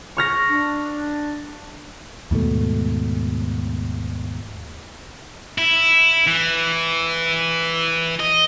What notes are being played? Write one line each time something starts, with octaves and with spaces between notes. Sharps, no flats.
C#6 F6 A#6
D4
D#2 G#2 B2 A3
E4
E3
D#5